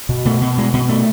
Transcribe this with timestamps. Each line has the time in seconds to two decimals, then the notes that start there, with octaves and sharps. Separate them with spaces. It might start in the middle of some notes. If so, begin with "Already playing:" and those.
0.09 B2
0.25 B2 A3
0.41 B2
0.58 B2 G#3
0.73 B2
0.89 B2 A3